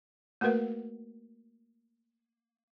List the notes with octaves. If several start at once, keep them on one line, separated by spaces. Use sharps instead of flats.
A3 A#3 F#4 A#4 B4 F5